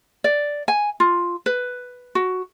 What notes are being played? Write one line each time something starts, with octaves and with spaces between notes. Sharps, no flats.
D5
G#5
F4
B4
F#4